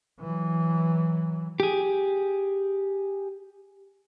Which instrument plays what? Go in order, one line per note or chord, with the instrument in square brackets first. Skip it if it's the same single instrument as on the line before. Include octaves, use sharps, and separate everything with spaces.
[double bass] E3 F#3
[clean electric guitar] G4 G#4